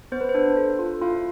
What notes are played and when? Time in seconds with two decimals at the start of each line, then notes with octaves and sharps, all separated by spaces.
0.12 B3 C5
0.21 B4
0.29 C5
0.34 D4
0.57 A4
0.79 F4
1.01 E4 F4 F5